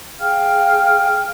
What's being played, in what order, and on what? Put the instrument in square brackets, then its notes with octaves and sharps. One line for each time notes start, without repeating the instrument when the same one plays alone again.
[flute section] G#4 F5 G5 F6